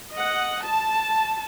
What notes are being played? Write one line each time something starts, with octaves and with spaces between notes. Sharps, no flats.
D#5 F#5
A5